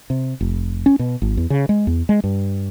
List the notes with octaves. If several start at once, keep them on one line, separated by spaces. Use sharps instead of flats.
C3
F1
C#4
B2
G#1
E2
C#3
G#3
E2
G#3
G2